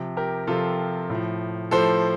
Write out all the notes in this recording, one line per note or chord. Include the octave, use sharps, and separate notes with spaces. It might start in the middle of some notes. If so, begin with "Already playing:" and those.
Already playing: C3 F3
G4 A#4
C3 F3 F4 A4
A2 F3
A2 F3 A4 C5